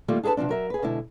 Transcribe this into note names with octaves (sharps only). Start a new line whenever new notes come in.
D#3 G3 A3 A#3 F4
D4 G#4 A4 B4 A5
C3 F3 B3 C4 D4
F#3 A#4 E5
G#4 B4
B2 D3 G#3 E4